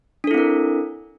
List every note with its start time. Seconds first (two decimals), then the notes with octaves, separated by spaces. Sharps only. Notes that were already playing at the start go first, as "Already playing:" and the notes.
0.24 D4
0.27 A4
0.31 E4
0.34 C4
0.38 A#4